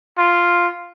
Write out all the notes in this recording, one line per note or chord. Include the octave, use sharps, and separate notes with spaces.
F4